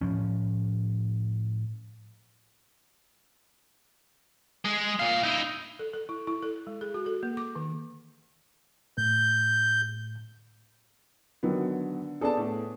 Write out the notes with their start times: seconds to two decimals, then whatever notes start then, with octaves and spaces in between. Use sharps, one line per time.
0.01 A2 F3 C#4
4.65 G#3 G#4
4.99 A#2 F5
5.23 D#4 E4
5.79 A4
5.94 A4
6.09 E4
6.27 E4
6.42 A4
6.67 G#3
6.81 G#4
6.94 F#4
7.06 A4
7.23 A#3
7.37 D6
7.56 D#3
8.98 A2 G6
11.43 D3 D#3 F#3 B3
12.21 B3 D4 G#4 A4 D5 A5
12.37 A2